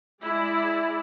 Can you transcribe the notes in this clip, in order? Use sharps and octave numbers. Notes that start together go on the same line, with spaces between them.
G#3 E4 D5